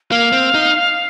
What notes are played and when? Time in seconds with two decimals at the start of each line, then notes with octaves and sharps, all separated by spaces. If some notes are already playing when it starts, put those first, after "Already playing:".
0.10 A#3 F5
0.33 C4
0.54 D#4